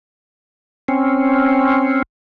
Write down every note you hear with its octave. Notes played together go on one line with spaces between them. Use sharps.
C4 C#4